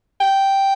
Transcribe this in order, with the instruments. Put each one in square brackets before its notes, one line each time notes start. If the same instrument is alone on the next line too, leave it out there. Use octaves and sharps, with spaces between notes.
[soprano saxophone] G5